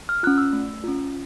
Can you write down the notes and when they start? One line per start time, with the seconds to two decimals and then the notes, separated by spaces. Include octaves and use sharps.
0.09 F6
0.23 C#4 F4 F#6
0.38 E6
0.53 A3
0.84 C#4 F4